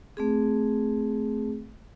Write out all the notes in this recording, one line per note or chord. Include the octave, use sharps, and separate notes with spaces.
A3 C4 G#4